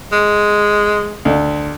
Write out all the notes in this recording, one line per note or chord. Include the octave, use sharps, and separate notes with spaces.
G#3
D2